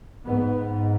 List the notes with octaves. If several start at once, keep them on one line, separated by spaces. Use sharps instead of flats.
G#2 B3